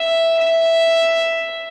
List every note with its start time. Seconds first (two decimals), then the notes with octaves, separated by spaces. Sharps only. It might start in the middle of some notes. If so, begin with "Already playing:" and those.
Already playing: E5
0.39 E5